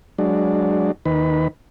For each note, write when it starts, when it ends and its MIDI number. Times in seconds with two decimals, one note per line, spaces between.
0.18 0.92 54
0.18 0.92 56
0.18 0.92 62
1.05 1.48 39
1.05 1.48 51
1.05 1.48 71